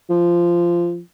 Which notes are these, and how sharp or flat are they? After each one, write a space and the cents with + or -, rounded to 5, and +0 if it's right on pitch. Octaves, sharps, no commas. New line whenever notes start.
F3 -15